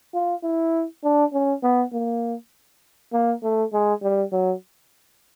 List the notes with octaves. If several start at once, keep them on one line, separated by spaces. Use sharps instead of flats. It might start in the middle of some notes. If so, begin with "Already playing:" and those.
F4
E4
D4
C#4
B3
A#3
A#3
A3
G#3
G3
F#3